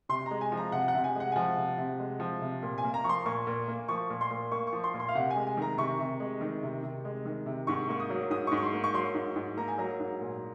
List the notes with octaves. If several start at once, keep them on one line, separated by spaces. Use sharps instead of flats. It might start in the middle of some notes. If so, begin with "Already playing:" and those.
C3 C6
G#3 A#5
G#5
F3
A#5
C3 F#5
F#5
C3
G#5
G#3 F#5
G#5
F3 F#5
C3
C3
G#3
F3
C3
A#2
G#5
A#3
A#5
F3 C6 C#6
A#2 C#6
A#2
A#3
F3 C#6
A#2
C6
A#2
A#3 C#6
C#6
F3
C6
A#2
C6
F5
C3 F#5
G#5
G#3
G#5
D#3 A#5
C3 C#6
C3
G#3
D#3
C3
C3
G#3
D#3
C3
G#2 C#6
A#3 C#6
D#6
F#3
G#2 D#6
C#6
G#2
C#6
C6
A#3
C#6
F#3 C6
G#2
G#2
A#3 A#5
G#5
F#3 A#5
G#2
A#2